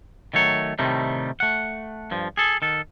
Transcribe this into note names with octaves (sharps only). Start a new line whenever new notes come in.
D#3 F#3 A3 C#5
A2 C3 D#3 G3 A3
A3 F#5
G2 F3
G#4 A4
D#3 A4